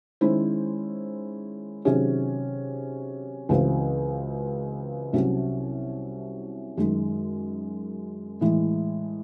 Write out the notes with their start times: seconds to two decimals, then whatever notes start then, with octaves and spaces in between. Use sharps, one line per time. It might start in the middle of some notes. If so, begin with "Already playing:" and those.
0.21 D#3 G#3 C#4 E4 C5
1.85 C3 D#3 F#3 C#4 G#4
3.49 C#2 C#3 E3 C4 F#4
5.13 C2 C3 F#3 C#4
6.77 F#2 D#3 G#3
8.41 A2 E3 G#3